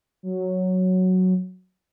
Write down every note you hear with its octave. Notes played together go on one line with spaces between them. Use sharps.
F#3